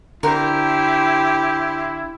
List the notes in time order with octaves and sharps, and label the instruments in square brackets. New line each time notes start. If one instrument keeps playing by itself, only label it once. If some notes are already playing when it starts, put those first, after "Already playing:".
[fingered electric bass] D3 [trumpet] E4 [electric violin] G4 C5 [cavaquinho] A#4